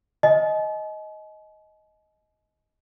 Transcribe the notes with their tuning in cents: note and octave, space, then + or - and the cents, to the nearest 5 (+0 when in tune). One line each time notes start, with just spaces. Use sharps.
D#5 +10 G#5 +45